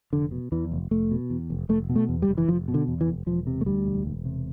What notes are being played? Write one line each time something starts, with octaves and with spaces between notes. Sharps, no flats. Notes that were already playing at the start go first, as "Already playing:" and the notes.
F1 D3
B2
E2 E3
F1
F1 A3
B2
E2
F1
F1 A3
B2
A3
E2
G3
F1
E3
F1 F3
B2
D3
E2
E3
F1
E1 F3
C3
A3
D2 G3
E1
E1
C3